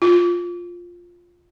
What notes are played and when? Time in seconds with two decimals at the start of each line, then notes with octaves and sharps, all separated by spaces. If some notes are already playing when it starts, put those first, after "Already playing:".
0.02 F4